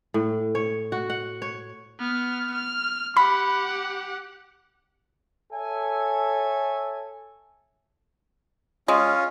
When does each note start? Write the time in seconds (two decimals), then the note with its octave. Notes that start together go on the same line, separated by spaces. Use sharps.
0.14 A2
0.55 C#5
0.92 F#4
1.10 F#5
1.42 C#5
1.99 B3 F6
2.54 F6
3.17 G4 F#5 B5
5.52 A4 C#5 E5 G#5
8.88 G#3 C#4 F4